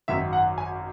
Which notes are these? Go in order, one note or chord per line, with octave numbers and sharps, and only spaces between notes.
G#1 F#2 D#3 E5
F#5
G#5